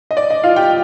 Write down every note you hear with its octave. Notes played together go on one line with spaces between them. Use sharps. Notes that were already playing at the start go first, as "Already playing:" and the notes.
D#5
D5
D#5
F4 F5
G4 G5